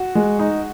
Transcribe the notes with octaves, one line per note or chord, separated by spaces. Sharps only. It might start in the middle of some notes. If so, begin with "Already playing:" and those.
Already playing: F#4
G#3
D#4